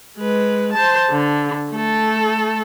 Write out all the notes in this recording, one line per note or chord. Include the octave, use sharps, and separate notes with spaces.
G#3 B4
C5 A5
D3
A3 A4